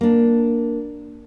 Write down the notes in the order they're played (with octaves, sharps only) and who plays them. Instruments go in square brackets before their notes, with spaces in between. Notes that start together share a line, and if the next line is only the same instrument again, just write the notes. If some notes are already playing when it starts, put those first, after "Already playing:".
[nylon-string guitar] A#3 D4